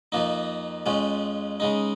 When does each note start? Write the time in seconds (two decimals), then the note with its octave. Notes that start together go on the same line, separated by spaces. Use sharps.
0.12 F2 F3 A#3 D#4
0.86 F2 F3 G#3 C#4
1.60 C#3 G#3 D#4